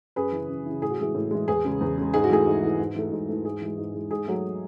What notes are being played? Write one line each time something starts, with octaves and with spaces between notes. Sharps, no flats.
F#2 G#4 B4
C#3 E3
F#2
C#3 E3
A2 G#4
F#4
E3 G#3 G#4
A2
E3 G#3
E2 G#4
C#3 G#3
E2
C#3 G#3
G#2 G#4
F#4
E3 A3 G#4
G#2
E3 A3
G#2
E3 A3
G#2
E3 A3
G#2 G#4
E3 G#3
G#2
E3 G#3
G#2 G#4
F#3 A3